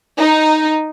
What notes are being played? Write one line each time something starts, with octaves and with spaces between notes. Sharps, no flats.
D#4